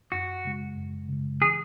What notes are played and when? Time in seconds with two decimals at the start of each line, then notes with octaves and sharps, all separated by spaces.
0.12 F#2 F#4
0.45 C#3 G#3
0.77 F#2
1.09 C#3 G#3
1.42 E3 G#4